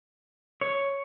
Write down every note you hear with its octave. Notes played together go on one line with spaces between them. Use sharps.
C#5